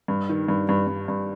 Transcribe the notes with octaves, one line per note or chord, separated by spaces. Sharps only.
G2
D#3
G2
G2
G2
G2